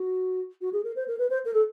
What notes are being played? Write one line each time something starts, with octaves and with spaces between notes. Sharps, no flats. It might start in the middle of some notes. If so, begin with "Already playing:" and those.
Already playing: F#4
F#4
G#4
A#4
C5
A#4
B4
C5
A#4
A4